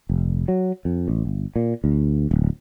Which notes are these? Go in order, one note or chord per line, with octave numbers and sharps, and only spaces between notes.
F1
F#3
F2
A1
G1
A#2
D2
D1